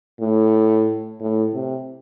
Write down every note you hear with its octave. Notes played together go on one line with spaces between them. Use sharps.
A2
A2
C3